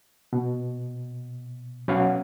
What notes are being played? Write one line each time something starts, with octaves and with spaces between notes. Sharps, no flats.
B2
B2 F#3 C#4 B4 F5 F#5